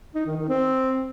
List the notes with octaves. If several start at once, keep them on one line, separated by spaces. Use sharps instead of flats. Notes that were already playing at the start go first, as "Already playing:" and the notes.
D#4
D#3
D#3
C4